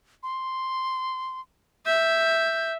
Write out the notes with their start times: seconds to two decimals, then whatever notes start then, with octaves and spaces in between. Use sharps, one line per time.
0.23 C6
1.86 E5 G6